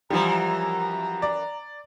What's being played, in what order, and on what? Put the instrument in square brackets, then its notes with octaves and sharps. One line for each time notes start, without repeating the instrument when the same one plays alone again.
[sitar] F#2 E3 [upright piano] F3 G3 [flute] A#5
[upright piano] D5